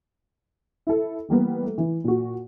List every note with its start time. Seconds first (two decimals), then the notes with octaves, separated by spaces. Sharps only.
0.87 E4 A4
1.28 E3 G3 A#3 B3
1.63 A3
1.78 E3
2.04 A#2 F#4